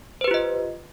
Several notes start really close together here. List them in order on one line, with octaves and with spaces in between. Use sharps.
C5 B4 G4 F4 D#5